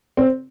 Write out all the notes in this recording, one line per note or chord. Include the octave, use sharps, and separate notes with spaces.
C4